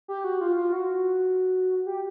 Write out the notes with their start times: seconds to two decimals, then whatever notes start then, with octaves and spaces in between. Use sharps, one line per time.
0.08 G4
0.24 F#4
0.41 F4
0.57 F4
0.73 F#4
1.86 G4